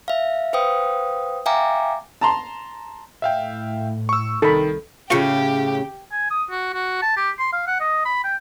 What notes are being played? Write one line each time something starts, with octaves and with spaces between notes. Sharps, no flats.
E5 F5
B4 C5 F5 G5 D#6
E5 F5 G5 G#5 A#5 D6
A5 A#5 C6
A2 E5 F5 G5
C#6 E6
C2 D#3 A4 B5
A2 C#3 C#4 F4 G4 G5 C#6
G#5
D#6
F#4
F#4
A5
G4
C6
F5
F#5
D#5
B5
G5